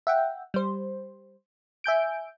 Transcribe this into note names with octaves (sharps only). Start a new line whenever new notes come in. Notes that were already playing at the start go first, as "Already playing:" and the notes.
E5 F#5 G5
G3 C5
E5 G#5 G6 D7